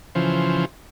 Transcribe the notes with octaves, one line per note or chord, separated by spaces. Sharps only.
C#3 E3 F3 C5